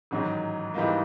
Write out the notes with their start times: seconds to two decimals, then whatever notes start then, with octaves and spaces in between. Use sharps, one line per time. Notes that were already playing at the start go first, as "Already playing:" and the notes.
0.11 A1 G#2 D#3 F#3
0.74 G#2 E3 G3 A#3 D#4